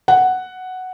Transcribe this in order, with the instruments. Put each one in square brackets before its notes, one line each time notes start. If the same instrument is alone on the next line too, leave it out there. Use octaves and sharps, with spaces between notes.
[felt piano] F#5